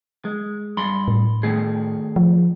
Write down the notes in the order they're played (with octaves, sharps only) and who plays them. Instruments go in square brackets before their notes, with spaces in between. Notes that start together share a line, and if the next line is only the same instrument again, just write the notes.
[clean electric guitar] G#3
G2 B5 C6
[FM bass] A2
[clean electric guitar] D#3 A3 G#4
[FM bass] F3